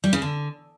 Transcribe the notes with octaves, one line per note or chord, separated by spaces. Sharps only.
G3
C#3
D3